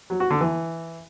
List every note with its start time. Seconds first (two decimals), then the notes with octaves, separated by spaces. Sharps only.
0.10 F#3
0.20 F#4
0.30 D3
0.41 E3